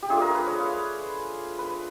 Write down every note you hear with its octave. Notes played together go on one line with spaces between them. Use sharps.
G4
A3 D4 F4 G#4
A#4
B4
C#5
F5
B4